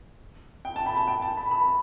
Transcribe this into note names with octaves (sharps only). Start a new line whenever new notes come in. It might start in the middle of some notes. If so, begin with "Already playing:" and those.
G5
A5
B5
A5
G5
A5
B5
B5